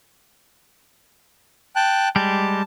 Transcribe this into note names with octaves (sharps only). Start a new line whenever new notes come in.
G5 A5 F#6
G3 G#3 G4 A5